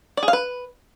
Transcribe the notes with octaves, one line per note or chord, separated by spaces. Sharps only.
D5
G#4
F5
B4